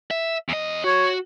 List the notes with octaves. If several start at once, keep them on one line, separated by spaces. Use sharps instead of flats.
E5
E2 D#5
F#4 C#5